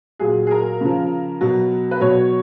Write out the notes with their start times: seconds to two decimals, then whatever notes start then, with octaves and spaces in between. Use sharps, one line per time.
0.19 A#2 F#3 G#4
0.47 G#4
0.51 A#4
0.80 C#3 F3
1.41 B2 F#3
1.91 B4
2.00 B2 F#3 C#5